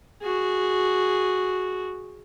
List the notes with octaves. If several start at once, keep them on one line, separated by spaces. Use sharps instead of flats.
F#4 G#4